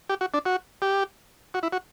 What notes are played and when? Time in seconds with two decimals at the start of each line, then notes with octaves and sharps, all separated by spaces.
0.09 G4
0.21 F#4
0.34 D4
0.45 F#4
0.82 G4
1.54 F#4
1.63 E4
1.72 F#4